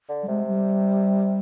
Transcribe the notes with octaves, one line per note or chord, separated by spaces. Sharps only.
D3
G3
C3 G#3
G3